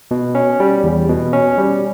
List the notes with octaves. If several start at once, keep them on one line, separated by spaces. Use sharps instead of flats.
B2
C#4
G3
E2
B2
C#4
G3